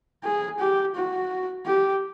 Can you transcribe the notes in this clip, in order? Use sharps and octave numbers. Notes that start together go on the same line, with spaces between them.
G#4
G4
F#4
G4